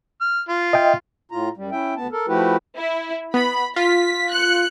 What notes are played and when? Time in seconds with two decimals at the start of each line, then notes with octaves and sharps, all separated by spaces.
0.21 F6
0.49 F4
0.73 D#5 E5 G5
1.32 A2 F4 A#5
1.57 F#2 G3
1.72 C#4 E4 E5 G5
1.97 D2 B3 A5
2.12 A4 A#4
2.28 F3 A3 E4 F#4 G4 B4
2.75 E4
3.34 B3 B5
3.76 F4 B6
4.31 F#6 C#7